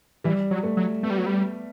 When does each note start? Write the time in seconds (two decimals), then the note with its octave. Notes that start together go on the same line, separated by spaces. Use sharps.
0.24 E3 G3
0.51 F#3
0.63 A3
0.77 F#3
1.03 A3 B3
1.10 G3
1.18 F#3
1.26 G3